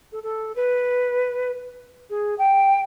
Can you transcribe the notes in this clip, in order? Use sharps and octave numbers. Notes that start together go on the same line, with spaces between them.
A4
A4
B4
G#4
G5